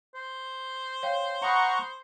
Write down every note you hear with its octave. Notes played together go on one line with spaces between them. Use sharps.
C5
C#5 F5 G5
F#5 A#5 B5 C#6 D#6 C#7